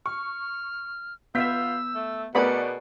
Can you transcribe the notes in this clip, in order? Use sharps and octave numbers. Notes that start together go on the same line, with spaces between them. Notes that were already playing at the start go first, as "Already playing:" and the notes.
C#6 F6
B3 F4 E5 E6 G6 B6
A3
B2 A3 B3 G#4 A#4 D5 B5 C#7